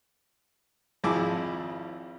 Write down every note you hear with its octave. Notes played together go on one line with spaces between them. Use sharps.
G#1 F2 E4 G#4 A5 D6